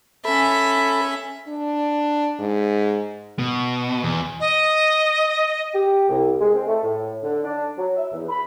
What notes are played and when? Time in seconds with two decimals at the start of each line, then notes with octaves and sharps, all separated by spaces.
0.25 C#4 A4 E5 B5
1.48 D4
2.40 G#2
3.39 B2
4.03 E2
4.40 D#5
5.74 G4
6.09 C2
6.40 G#3
6.55 C4
6.67 A3
6.83 A2
7.23 D3
7.43 D4
7.78 F#3
7.96 E5
8.13 E2
8.29 B5